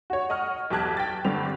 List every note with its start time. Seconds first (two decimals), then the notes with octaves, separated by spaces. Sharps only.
0.10 F#4 C#5
0.30 D#5 F#5 C#6 F6
0.71 B1 E2 G4 A5 F#6 G#6
0.97 G5 A6
1.25 G1 G2 D3 C4 G4 F7